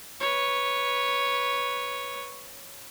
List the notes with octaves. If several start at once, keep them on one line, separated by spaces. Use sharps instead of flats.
B4 C#5